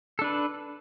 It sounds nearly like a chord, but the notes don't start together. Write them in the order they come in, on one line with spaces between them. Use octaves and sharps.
A4 D4 B4